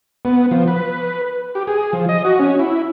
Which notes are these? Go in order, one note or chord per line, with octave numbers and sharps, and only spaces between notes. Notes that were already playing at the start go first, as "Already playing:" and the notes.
B3
F3
B4
G4
G#4
F3
D#5
F#4
C#4
E4